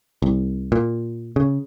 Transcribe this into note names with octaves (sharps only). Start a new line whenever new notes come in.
C2
A#2
C#3